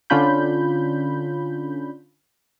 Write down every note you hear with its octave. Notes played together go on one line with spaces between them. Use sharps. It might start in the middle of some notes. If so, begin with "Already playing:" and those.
D3 C#4 D4 F4 B5 G6